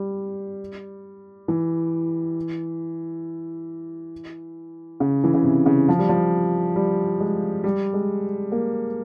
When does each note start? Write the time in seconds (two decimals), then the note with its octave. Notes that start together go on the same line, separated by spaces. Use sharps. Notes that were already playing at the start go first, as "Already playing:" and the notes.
Already playing: G3
1.48 E3
5.00 C#3
5.24 E3
5.34 C#3
5.44 C3
5.66 C#3
5.88 F3
5.99 G3
6.09 F3
6.76 G3
7.20 G#3
7.64 G3
7.94 G#3
8.52 A#3